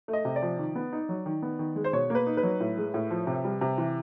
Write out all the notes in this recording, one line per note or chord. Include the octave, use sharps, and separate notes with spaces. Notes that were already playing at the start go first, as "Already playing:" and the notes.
A3
D#5
C3
D5
F3
D#3
B3
D#4
F#3
D#3
B3
D#3
G#3
C5
B2 C#5
A#3 B4
D#4
B4
F#3
A2
G#3
A2
F3
C3
G3
C3
E3